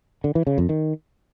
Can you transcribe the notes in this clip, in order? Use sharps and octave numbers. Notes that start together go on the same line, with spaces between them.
D3
E3
C#3
F2
D#3